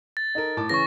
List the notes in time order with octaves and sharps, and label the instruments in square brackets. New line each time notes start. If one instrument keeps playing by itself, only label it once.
[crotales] A6
[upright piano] D#4 A4 A#4
A2 A5 D6
[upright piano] C#3 E3 C#4 [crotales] C#6 A#6